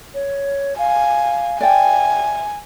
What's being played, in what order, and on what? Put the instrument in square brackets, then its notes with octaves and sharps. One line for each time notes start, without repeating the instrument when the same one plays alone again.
[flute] C#5
[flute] F5 [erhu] G#5
[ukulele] D5 G5 [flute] E5 [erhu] G#5